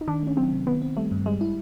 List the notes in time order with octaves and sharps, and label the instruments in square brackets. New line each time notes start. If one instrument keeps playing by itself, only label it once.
[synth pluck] D#4
[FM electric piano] D#3 [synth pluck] D4
[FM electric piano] A3 [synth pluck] C#4
[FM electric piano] F#3 [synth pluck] C4
[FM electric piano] C3
[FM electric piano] D#3 [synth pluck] B3
[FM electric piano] C4
[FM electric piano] G3 [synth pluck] A3
[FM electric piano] G2
[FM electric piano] G3 [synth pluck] G#3
[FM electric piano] E4